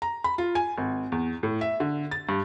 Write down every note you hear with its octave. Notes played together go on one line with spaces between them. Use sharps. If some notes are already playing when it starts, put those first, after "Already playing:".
A#5
B5
F4
G#5
G#1
E2
A2
E5
D3
A6
G2